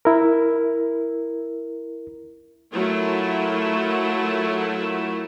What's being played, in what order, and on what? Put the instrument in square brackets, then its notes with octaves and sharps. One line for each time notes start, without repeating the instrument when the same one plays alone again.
[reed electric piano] E4 A#4
[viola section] F#3 A3 E4 F4 A#4